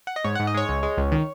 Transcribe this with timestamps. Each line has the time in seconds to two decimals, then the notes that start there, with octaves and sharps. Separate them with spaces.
0.07 F#5
0.16 D#5
0.24 G#2 C#5
0.35 G#2 F#5
0.47 D#5
0.54 G#3 C#5
0.69 C#2
0.83 G#3
0.97 C#2
1.12 D#3